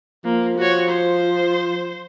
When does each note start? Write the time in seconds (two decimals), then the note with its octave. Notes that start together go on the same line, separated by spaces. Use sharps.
0.25 F3 A#3
0.58 F#4 C#5
0.89 C5